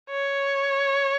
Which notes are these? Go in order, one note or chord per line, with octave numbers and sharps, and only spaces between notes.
C#5